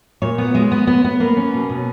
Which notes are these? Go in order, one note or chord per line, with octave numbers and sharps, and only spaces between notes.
A#2 C#5
B3
G#3
B3
B3
B3
A#3 B4
C#4
B2
B2